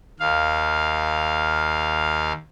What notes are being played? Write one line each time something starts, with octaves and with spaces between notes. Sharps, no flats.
D#2 F5